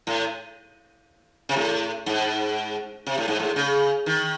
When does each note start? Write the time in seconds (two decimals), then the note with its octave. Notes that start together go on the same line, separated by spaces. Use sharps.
0.07 A2
1.49 C3
1.56 A2
2.06 G#2
3.07 C3
3.18 A2
3.28 G#2
3.40 A2
3.56 C#3
4.06 D#3